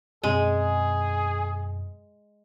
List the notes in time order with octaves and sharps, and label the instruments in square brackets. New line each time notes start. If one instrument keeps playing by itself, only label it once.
[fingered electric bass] F#2 B2 C4 [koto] G#3 [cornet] G#4